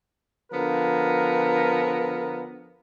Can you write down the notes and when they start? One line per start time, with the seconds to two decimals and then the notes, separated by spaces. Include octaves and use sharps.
0.52 D3 F3 B3 A#4